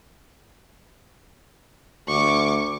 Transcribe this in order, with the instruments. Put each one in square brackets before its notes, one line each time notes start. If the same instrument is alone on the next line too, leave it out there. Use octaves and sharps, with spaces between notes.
[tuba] D2 [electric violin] C#6 D6